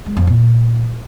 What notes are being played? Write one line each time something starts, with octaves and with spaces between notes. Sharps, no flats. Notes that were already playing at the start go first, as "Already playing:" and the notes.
G#3
F2
A#2